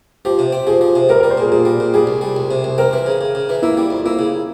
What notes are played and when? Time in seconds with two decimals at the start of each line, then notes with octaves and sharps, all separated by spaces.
0.25 F3 G4
0.39 C3
0.52 C4
0.67 F3 G#4
0.81 F3
0.96 C3
1.09 G3 A#4
1.20 G3 A#4
1.30 C5
1.38 A#2 G#4
1.51 A#2 G#4
1.65 G3
1.80 A#2
1.94 G3 G#4
2.07 C2
2.21 G3
2.36 C2
2.51 C3
2.64 C2
2.78 C4 A#4
2.93 E3
3.06 C#3
3.21 C#3
3.35 C#3
3.49 E3
3.62 A#3 E4
3.77 G3
3.90 F2
4.05 A#3 E4
4.19 C#3